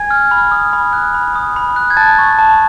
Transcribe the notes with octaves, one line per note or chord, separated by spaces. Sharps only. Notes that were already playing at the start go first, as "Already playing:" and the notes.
Already playing: G#5 G#6
F6
B5
D#6
B5
F#6
B5
D#6
B5
F#6
G#6
A5 A6
C#6
A5